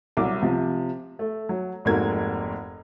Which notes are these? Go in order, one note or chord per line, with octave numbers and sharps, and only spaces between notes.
C2 F#3 E5 D6
C3 F3
A3
F#3
F1 G#2 A#3 F#4 G#6